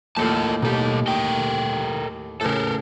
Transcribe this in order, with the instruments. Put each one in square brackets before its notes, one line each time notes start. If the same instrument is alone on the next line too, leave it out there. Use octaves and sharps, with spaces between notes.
[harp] D#2 A2 A4 [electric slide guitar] F4 A#4 A5
[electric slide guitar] B2 A4 [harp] D#4 G4
[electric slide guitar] A4 A#4 G5
[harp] A2 C#3 [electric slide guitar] A4 A#4